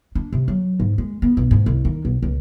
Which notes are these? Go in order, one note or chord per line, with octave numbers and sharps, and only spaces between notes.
D4
C3
F#3
G#2
G#3
B3
B1
G#2
C2
D#3
B1
C#2